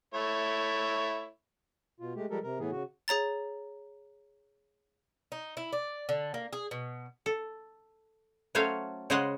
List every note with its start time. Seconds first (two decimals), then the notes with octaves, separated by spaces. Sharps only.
0.14 A3 E4 C#5
2.00 B2 F4
2.16 G#3 A3 G4
2.30 F3 G3 G#3 G4 A4 A#4
2.43 C3 A#4
2.59 A2 E3 B3 G#4
2.72 C#3 F#4
3.08 G#4 C#5 A#5 A6
5.32 D#4
5.57 E4
5.73 D5
6.09 D3
6.34 A#3
6.53 G#4
6.71 B2
7.26 A4
8.55 F#3 A3 C#4 C5 C#5 F5
9.10 C#3 G#3 C5 C#5 D#5 F#5